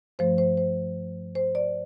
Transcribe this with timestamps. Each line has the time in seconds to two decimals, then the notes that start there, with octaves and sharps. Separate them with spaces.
0.19 G2 F3 A3 C5
0.38 C5
0.57 C5
1.35 C5
1.55 D5